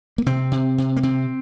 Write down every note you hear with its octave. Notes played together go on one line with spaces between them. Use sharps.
A#3
C3 C4
C3
C3
A#3
C3 C4